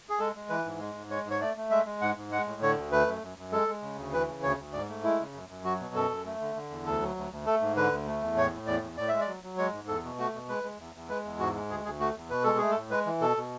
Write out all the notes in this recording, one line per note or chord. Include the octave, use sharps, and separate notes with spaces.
G#4
G#3 A4
G#3
E3 B4
G#2
G#3
G#2
G#3 C#5
G#2
C#5
A3 D5
A3
G#3 E5
G#3
G#2 F#5
G#2
G#3 F#5
A2
D3 C#5
D2
A3 B4
F#2
F#2
F#2
G#3 A4
G#3
C#3
D2
E3 B4
C#3
D2 C#5
D2
G#2 D5
A3
G#3 E4
C#3
F#2
F#2
F#3 F#4
B2
F#2 A4
F#2
A3
D3
D3
E2
D2 A4
F#3
D2
D2
A3 A4
G#2
D3 B4
D2
A3
E2
A2 C#5
A2
E2 D5
E2
A2 D5
G#3 E5
D5
F#3
F#3
G#3 C#5
G#2
E2 A4
B2
A3 F#4
B2
G#3 B4
G#3
E2
E2
G#3 B4
E2
G#2 F#4
G#3
D2 G#4
D2 G#4
A3 F#4
E2
B2 B4
G#3 A4
A3 G#4
A4
A2
G#3 B4
E3
B2 A4
B2